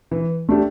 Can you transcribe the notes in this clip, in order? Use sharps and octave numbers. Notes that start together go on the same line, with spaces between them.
E3
A3 D4 G4